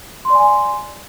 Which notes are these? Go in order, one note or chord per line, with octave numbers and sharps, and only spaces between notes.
D5 G#5 C6